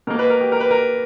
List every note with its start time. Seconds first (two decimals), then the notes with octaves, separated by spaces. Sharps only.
0.07 B2 A#3 A#4
0.19 B4
0.30 A#4
0.41 G4
0.52 A#4
0.60 B4
0.71 A#4